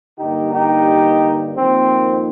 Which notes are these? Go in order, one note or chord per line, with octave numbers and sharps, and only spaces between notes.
G2 D3 G3 A#3 D#4 G4
D#4 G4
F2 D#3 A#3 C4